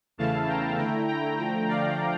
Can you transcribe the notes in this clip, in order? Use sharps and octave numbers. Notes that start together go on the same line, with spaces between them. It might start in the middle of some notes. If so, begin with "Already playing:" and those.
E2 C#3 E3 A3 E4 F5 A5
G5 A#5
D3 A3 E4
G5 A#5
D3 F3 A3
D5 F5